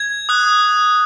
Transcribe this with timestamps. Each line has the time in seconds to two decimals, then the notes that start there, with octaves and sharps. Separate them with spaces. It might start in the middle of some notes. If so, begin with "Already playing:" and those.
Already playing: G#6
0.29 D#6 F#6